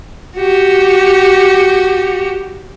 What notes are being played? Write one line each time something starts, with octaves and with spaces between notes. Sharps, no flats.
F#4 G4